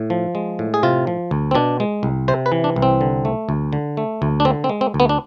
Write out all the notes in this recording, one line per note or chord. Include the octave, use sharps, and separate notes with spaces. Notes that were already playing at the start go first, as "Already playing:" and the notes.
Already playing: A2
F3
G#3
A2
G#4
C3 F4
F3
D2
C4
B2 D4
G#3
C2
C3 C5
B4
E3
D4
C2
C4
D3
A3
D2
D3
A3
D2
D4
D3 C4
C4
G#3
C4
D2
B3
D4